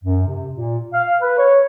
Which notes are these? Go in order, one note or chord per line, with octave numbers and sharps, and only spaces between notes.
F#2
C3
A#2
F5
B4
C#5